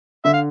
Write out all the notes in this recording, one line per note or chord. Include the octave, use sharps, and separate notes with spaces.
D3 E5
F5